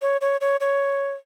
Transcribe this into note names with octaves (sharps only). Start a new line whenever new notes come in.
C#5
C#5
C#5
C#5